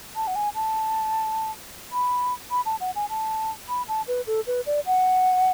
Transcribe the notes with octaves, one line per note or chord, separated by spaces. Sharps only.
A5
F#5
G#5
A5
B5
B5
A5
F#5
G#5
A5
B5
A5
B4
A4
B4
D5
F#5